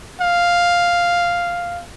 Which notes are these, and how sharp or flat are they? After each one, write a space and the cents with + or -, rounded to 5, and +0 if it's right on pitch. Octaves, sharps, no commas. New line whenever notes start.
F5 +0